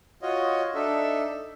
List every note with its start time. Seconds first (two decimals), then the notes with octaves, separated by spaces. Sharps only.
0.22 F4 F#4 C#5 D#5
0.75 D4 D#4 A4 E5